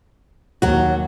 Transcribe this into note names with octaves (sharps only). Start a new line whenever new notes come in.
D#2 F#3 F#4